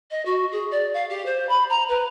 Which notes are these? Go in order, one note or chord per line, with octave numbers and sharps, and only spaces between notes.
D#5
F#4
G#4
D5
F5
G4
C5
B5
A#5
B4